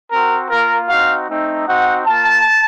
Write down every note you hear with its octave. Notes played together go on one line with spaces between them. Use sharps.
C4 F#4 A#4
A#3 F4 A#4
C4 D#4 F#4 F5
A3 C4 D#4
C4 D#4 F#4 F#5
A#3 F4 A5